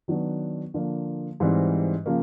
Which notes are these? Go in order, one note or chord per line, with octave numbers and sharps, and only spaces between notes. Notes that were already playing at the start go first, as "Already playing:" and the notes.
D#3 F#3 B3 D4
D3 F3 A#3
G#2 E3 G3 C4
C#3 F3 A#3